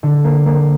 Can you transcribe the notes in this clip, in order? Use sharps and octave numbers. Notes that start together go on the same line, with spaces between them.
D3
A#3
A#3